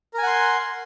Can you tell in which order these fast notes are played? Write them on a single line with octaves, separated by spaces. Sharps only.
A#4 G#5 F#5 C6